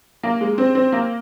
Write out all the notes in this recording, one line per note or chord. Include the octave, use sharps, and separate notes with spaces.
A#3
G#3
C4
C4
A#3